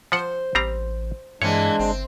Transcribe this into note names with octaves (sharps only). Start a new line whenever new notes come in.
F3 C5 F#5
A1 G3 C4 A#5
G2 E3 G#3 A#3 C4 D4 C#5
G1 C4